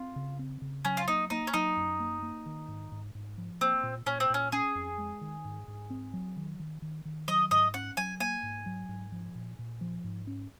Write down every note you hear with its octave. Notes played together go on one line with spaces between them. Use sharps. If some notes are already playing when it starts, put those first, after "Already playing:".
Already playing: C4 F4
C#3
C4
C#3
F#3 C#4
F4
A#3 D#4
A#3 D#4
C#4
F#3 D#4
F#2
A#3
A#3
D#3
G#2
G#2
G#2
F3
A#3 C4
A#2
A#2 C#4
C4
A#2 C#4
C#4 G#4
F2
G#3
D#3
G#2
G#2
C4
F#3
D#3
D#3
D#3
D#3
F#3 D#5
G#2 D#5
C#4 F#5
F#3 G#5
A#3 G#5
G#2
F#3
G#2
F3
A#2
A#2
F3
G#2
C#4